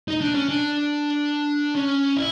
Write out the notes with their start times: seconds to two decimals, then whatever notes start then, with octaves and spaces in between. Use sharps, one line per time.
0.08 D#4
0.21 D4
0.34 C#4
0.49 D4
1.75 C#4
2.17 E4